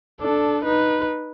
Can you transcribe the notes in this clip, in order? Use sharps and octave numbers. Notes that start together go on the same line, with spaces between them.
D4 A4
D#4 B4